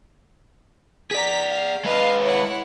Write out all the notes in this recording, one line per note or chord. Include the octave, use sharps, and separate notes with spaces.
G#4 D5 A#5 B6
F5
G#3 B4 D#5 F5 A5
E4 C#5 F#5